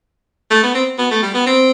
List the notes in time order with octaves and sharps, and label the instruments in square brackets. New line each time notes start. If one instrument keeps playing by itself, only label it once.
[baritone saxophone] A3
B3
C4
B3
A3
G3
B3
C4